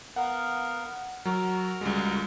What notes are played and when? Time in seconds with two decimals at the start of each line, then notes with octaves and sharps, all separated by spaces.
0.16 B3 A#4 F5 F#5
1.25 F#3 F#4 A#4 A#5
1.81 C#2 G3 G#3